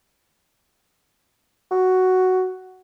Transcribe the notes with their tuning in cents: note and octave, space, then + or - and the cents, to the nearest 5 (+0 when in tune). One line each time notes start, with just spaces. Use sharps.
F#4 +5